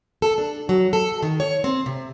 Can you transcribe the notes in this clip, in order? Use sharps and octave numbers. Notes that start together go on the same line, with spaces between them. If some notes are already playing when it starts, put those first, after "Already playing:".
A4
D4
F#3
A4
D#3
C#5
C4
C3